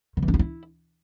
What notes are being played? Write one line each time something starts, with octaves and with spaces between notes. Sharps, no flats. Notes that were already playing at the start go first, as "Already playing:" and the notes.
D#3
E3
D4
F4
E4